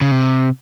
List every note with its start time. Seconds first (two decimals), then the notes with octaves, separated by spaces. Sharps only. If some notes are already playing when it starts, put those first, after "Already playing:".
0.01 C#3
0.11 C3